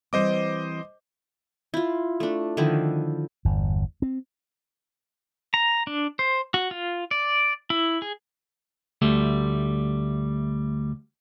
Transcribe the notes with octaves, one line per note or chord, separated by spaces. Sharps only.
E3 G3 C4 C5 D#5 D6
E4 F4
A3 D4
D3 D#3 F3 E4
G1 E2
C4
A#5
D4
C5
F#4
F4
D5
E4
G#4
D2 G3 A3